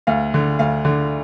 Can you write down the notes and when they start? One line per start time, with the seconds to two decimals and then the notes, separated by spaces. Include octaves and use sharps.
0.07 D2 F5
0.34 D3
0.59 D2 F5
0.85 D3